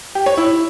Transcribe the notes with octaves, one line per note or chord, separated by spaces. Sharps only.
G4
C#5
E4